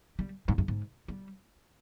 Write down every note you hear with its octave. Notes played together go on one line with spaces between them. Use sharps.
G3
G#2
G2
G#2
G3